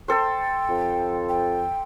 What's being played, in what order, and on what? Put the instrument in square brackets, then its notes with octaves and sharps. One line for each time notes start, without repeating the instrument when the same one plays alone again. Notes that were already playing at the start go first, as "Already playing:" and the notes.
[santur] A4 C5 [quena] G5
[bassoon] F2
[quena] G5